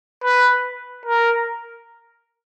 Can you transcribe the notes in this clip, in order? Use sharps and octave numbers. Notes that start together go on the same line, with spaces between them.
B4
A#4